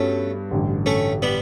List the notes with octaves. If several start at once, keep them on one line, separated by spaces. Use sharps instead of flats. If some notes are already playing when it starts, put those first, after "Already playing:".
Already playing: G2 A3 B3 C#4 F#4
A1 G2 D3
A3 C#4
G3 B3